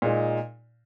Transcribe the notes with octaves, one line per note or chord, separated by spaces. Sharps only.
A#2 G#3 D#4